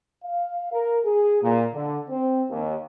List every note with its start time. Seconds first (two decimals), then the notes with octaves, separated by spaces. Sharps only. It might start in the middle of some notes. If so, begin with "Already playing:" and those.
0.24 F5
0.72 A#4
1.05 G#4
1.42 A#2
1.74 D3
2.09 C4
2.50 D#2